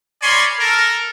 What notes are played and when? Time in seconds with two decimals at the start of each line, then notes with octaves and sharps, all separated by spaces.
0.22 A#4 C#5 D5 G#5 B5 C6
0.59 A4 A#4